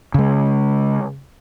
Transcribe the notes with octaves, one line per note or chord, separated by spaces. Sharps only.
C#3 G#3